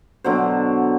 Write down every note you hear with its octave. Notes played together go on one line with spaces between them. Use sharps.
B2 D3 F#3 C5